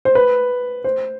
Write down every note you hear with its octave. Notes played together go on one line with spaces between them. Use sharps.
C5
B4
C5